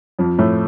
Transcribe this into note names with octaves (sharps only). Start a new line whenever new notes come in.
F2 F3
A2 A3